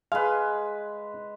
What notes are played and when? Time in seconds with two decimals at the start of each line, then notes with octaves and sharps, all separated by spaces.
0.12 G#3 B4 F5